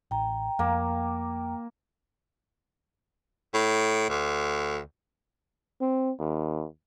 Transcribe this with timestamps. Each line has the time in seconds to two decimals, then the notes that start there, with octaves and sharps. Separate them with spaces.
0.11 A1 G5 A#5
0.59 F2 A#3
3.54 A2
4.09 D2
5.81 C4
6.19 D#2